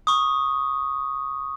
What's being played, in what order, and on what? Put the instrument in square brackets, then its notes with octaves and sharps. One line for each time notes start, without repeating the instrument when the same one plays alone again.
[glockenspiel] C#6 D#6